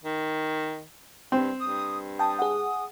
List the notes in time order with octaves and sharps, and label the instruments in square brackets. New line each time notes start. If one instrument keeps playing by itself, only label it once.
[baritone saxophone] D#3
[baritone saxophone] G2 [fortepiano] C4
[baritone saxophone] G2 [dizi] D#6
[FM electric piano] G5 A5 [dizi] D#6
[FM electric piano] G#4 F#5